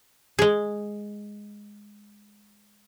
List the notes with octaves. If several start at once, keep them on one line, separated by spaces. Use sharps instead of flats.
G#3 G#4